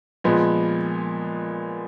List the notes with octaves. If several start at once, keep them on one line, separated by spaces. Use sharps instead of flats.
A#2 F3 G#3 B3